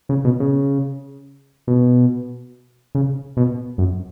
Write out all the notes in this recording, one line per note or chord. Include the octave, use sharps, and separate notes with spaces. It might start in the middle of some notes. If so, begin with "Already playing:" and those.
C#3
B2
C#3
B2
C#3
B2
F#2